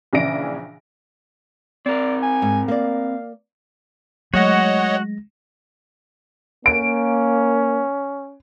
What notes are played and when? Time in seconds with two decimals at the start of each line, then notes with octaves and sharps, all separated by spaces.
0.13 A#1 C#3 E3 D5 A#6 D7
1.86 C4 A#4 D5
2.23 G#5
2.42 G#2
2.68 A#3 D5 F5
4.34 F#3 G#3 A3 F#4 C#5 D#5 F#5 A#6
6.66 A#3 C#4 D7